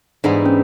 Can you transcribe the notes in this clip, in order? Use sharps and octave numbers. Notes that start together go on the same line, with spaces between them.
G#2 E3 G3 B3 D4 E4
C#4